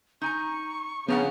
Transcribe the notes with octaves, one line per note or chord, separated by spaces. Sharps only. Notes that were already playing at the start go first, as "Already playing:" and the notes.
D#4 G#5 A#5 C#6
C#3 F3 B3 D4 F#5 A#5